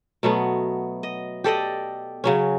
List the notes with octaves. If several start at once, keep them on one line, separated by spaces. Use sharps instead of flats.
B2 F#3 A3 B3
D#5
G4 A4 D5 D#5
C#3 F#3 C#4